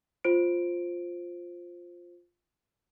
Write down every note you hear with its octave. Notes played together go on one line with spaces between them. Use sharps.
F4 C5 D7